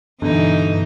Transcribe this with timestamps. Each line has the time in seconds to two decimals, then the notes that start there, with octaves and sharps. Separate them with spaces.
0.22 G2 B2 D3 E3 D#4